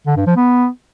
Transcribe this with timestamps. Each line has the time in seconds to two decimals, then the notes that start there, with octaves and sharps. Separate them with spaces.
0.07 D3
0.17 G2
0.27 F3
0.36 B3